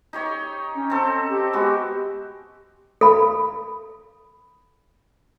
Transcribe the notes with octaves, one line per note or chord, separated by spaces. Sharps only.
D#4 G4 C#5
C#4
C4 A4
G4
G#3 B3 F#4
A4 B5